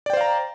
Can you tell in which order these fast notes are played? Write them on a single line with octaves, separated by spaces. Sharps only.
D5 G5 C5 F5 A#5